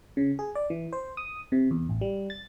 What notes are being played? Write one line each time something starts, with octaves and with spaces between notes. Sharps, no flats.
C#3
G#4
D5
E3
C5
D#6
C3
E2
A1
G3
A6